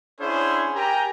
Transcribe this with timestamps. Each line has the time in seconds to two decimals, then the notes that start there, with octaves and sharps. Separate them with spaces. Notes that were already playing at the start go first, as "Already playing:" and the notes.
0.21 C#4 D4 E4 G#4 C5 F#5
0.75 G4 A#4 G5 G#5 A#5